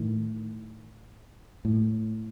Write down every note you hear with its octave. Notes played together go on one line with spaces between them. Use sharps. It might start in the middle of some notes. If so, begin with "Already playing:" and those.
Already playing: A2 D#3
A2